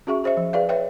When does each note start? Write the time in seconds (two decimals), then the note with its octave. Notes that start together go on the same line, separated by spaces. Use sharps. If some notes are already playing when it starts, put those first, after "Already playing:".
0.07 C#4 F#4 G#4 E5 C#6
0.24 G#4 C5 D#5 E5
0.37 F3
0.53 G#4 B4 D5 F5
0.69 B4 C#5 E5 G5